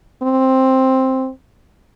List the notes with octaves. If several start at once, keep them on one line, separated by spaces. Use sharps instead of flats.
C4